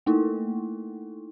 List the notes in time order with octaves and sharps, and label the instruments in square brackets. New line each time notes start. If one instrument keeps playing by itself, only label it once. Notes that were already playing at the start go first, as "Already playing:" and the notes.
[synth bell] A3 A#3 D#4 E4 A4